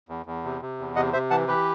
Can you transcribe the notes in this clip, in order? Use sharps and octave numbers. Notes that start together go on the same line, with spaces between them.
E2
E2
C3
C3
E2
C3 D#5 F#5
C3 C5 E5
E3 F#5 A5
E3 G4 B4